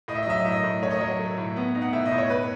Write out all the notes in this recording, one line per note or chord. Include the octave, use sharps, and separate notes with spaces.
A2 D#5
E5
D#5
F#3 E5
D#5
A2 E5
D#5
A2
A3 C#5
D#5
F#3 C#5
A3
A2
B3
D#4
F#5
A2 E5
D#5
A2
C#5
A2 B4